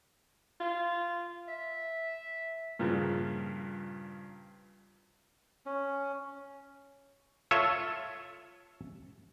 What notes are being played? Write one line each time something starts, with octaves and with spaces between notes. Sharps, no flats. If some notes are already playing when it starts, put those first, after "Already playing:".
F4
E5
G2 A#2 C#3 F3
C#4
F4 A4 C#5 E5